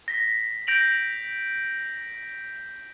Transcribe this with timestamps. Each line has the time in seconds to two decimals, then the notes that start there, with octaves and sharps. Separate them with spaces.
0.08 A#6 B6
0.67 G6 A#6 D7 F7 F#7